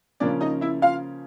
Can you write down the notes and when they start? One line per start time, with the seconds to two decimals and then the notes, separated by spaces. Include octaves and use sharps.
0.20 C#3 F3 A#3 C#4 D4 D5
0.41 D#4 D#5
0.61 E4 E5
0.82 F4 F5